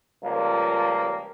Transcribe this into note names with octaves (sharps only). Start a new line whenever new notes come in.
C#2 F3 G3 A#3